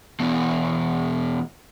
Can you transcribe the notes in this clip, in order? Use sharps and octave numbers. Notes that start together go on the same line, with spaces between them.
E2 B2